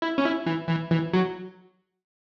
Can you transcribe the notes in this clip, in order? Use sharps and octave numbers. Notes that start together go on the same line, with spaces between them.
E4
C#4
E4
E3
E3
E3
F#3